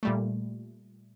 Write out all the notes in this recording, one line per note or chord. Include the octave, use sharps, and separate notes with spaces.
A#2 G3 A3